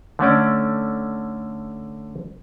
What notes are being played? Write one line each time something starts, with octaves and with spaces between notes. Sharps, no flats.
D3 A3 C#4 D5